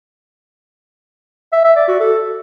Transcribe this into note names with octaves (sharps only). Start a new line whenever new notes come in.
E5
E5
D5
F#4
A4